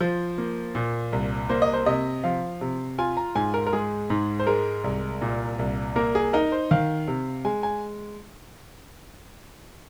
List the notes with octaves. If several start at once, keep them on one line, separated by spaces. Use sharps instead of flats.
F3 C5
A#3
A#2
C2
A#3 C5
D#5
C5
C3 D#5
F3 F5
C3
F4 G#5
A#5
G#2 G#5
A#4
A#4
G#3 G#4
G#2
C5
G#3 A#4
C2
A#2
C2
A#3 A#4
G#4
D#4 A#4
C5
D#3 F5
C3
G#3 G#5
G#5